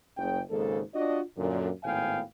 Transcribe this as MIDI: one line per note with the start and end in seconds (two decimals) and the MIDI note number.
0.17 0.42 30
0.17 0.42 49
0.17 0.42 79
0.50 0.81 32
0.50 0.81 44
0.50 0.81 49
0.50 0.81 58
0.50 0.81 69
0.94 1.21 62
0.94 1.21 65
0.94 1.21 66
0.94 1.21 74
0.94 1.21 75
1.38 1.70 42
1.38 1.70 46
1.38 1.70 50
1.84 2.22 32
1.84 2.22 45
1.84 2.22 59
1.84 2.22 77
1.84 2.22 79
1.84 2.22 80